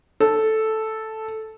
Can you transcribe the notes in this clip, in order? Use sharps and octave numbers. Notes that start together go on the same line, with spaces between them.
A4